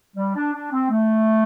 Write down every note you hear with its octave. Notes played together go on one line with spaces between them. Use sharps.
G3
D4
D4
C4
A3